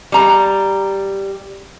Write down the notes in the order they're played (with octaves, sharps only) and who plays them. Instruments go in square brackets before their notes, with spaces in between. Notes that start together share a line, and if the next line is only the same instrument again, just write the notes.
[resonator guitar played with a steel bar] G3 A#5